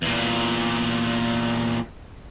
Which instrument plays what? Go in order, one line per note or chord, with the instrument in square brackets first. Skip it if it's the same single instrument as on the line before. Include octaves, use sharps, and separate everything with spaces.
[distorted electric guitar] E2 A#2